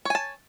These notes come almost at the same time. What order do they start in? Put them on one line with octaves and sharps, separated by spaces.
C#5 G#5 A5